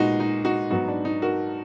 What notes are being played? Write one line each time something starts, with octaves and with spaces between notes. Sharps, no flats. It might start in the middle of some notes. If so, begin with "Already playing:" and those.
Already playing: A#2 G#3 B3 D#4 F#4
D#4
D#4 F#4
G#2 F#3 B3 D#4 F#4
D4
D#4
F#4 A#4